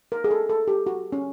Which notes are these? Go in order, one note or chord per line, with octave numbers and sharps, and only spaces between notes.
A#4
G#4
A4
A4
G4
F#4
C#4